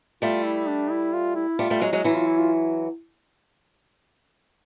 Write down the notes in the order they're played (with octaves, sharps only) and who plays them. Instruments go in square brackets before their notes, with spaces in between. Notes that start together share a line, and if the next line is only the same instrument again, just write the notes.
[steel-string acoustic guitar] G3 A3 [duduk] F4
[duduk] E4
D4
E4
F4
E4
[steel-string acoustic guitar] G3 A3 [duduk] F4
[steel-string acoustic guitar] G3 A3
F#3 G#3
F#3 G#3
[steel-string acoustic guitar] E3 F#3 [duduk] E4
[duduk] F4
E4
F4